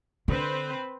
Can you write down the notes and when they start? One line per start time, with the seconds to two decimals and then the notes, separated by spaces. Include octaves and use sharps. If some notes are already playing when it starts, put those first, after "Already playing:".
0.28 D3 C4 B4 C5